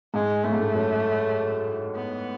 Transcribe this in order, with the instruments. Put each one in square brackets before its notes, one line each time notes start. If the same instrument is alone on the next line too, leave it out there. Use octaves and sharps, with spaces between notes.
[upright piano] G#2 [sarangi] G#3
[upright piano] A2 [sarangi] A3
[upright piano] G#2
A2
F#2
[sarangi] B3